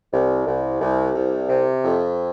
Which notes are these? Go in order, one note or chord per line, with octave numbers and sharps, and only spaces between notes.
C2
C2
C2
C2
C3
F2